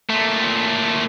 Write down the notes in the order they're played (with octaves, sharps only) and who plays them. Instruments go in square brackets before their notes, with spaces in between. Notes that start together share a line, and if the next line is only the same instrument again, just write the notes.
[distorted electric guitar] A#2 A3